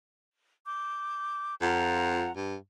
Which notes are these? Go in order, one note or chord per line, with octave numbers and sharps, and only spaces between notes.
D6 G6
F2 F4 F#5 A#5
G2